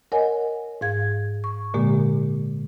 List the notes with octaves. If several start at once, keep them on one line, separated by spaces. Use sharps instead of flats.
A#4 C#5 D#5 F#5 G#5
G#2 F5 G#6
C#6
A#2 D3 G#3 A#3 G4